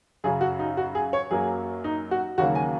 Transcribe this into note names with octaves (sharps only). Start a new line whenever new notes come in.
F#2 C#3 F#3 G#4
F#4
D#4
F#4
G#4
C#5
F#2 F#3 A#3 G#4
D#4
F#4
D#2 C#3 F#3 A#3 F#4
G#5